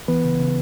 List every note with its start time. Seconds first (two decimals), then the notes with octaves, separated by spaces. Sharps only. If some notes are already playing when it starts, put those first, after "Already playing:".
0.08 E3 B3 B4
0.24 C#3
0.39 C#3